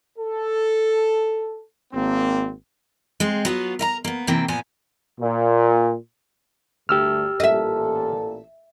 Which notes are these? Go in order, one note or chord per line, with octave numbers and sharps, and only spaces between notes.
A4
G#1 A#3 C4
G#3 C4
F#3 B3 F4
A#4 E5 A#5
A#3 B3
C3 D#3 E3 A#3 C4
A#2 F3 B3 G#5
A#2
D2 G2 A3 G4 E6 F6
A1 A#2 A4 D#5 E5